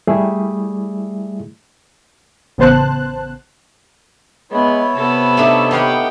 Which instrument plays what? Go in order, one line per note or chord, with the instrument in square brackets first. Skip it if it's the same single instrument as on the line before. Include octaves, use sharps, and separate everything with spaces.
[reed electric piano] G3 A3 E4 G#4
[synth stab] A1 C#3 B3 C5 A5 F#6
[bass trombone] G#3 [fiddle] B3 [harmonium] E4 C#5
[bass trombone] C3 [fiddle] B3 A4
[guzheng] A3 D4 D#4
[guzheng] B3 F5 F#5 [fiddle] G4